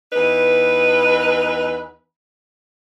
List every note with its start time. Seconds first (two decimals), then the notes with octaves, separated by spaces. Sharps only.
0.12 E2 D#4 B4